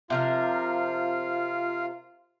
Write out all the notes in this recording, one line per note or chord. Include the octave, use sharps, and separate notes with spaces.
C3 F3 F4 A#4 F5